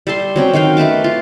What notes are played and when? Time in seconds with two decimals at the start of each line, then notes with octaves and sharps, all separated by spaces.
0.07 G3 E5 A5 C6
0.36 F#3 C4 C#4 G5
0.53 D#3 F#4 F5 G5
0.77 A3 B4 A5 D6
1.04 F4